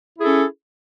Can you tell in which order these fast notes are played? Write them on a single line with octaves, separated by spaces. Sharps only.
E4 G#4 A4 C#4